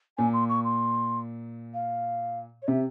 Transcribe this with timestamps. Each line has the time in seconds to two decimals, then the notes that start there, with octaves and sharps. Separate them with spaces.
0.18 A#2 G#5
0.33 C6
0.49 C#6
0.64 C6
1.74 F5
2.62 C#5
2.68 C3 E5